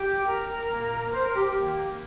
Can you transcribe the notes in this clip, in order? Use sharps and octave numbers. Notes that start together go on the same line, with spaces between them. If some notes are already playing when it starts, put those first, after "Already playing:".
Already playing: G4
A#4
A#2 A#3
C5
A#4
G4
G4
D#3 A#3